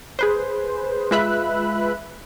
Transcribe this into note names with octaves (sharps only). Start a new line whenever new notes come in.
G#4 B4 C5
G#3 F4 B4 E5 B5 F#6